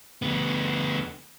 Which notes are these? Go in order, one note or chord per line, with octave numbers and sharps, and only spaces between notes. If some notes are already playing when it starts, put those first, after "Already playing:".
D2 B3